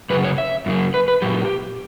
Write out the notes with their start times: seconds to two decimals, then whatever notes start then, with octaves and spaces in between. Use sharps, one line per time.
0.10 F#2 C#3 F#3 B4
0.24 C#5
0.38 E5
0.66 F#2 C#3 F#3
0.94 B4
1.08 B4
1.22 A#2 F#3 G4